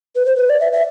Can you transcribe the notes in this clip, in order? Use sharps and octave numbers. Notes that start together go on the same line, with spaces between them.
B4
C5
B4
D5
E5
E5